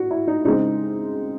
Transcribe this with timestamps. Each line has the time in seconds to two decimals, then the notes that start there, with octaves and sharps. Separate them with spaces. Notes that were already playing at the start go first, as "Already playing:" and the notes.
Already playing: A2 F#4
0.11 E4
0.27 D#4
0.45 C#3 G#3 C4 D#4